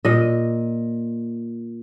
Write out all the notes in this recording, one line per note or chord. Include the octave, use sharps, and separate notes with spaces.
A#2 D#5